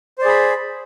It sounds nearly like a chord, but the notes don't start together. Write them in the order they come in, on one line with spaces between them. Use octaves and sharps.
C5 D5 G#4 B5